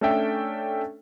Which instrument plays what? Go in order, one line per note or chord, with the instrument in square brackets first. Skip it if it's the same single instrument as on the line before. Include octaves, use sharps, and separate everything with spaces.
[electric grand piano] A3 C#4 D4 A4 E5 G5